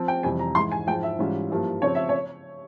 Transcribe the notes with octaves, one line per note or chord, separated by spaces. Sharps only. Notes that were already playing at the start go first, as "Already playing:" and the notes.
Already playing: F3 C4
G5
F2 C3 E3 G3 G#5
A#5
G#2 E3 G#3 E4 C6
G#5
G#2 F3 G#3 E4 G5
E5
G#2 E3 G3 C#4 F4
G2 F3 A#3 E4
C#3 F3 C4 C#5
E5
C#5